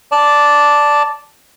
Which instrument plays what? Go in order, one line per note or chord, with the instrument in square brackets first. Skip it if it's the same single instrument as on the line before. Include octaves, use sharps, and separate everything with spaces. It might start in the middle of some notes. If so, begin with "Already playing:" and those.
[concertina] D5 A5